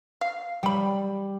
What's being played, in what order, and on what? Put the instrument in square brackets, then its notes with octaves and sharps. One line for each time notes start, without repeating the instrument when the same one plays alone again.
[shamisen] F5
[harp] G3 [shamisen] G5 B5